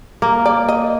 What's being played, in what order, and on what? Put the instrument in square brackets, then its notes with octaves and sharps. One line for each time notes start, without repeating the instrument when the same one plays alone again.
[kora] A#3
[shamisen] D5
D#5